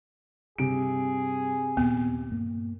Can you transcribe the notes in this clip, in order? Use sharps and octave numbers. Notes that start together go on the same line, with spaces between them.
G2 C3 G#4 D7
D#2 A#2 B3
G2 A#3